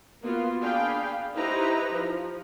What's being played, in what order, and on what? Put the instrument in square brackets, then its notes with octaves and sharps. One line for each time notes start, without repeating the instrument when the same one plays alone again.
[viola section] A#3 B3 F4 F#4
D4 G#4 F5 G5 B5
D#4 E4 G4 B4 C5 A#5
F3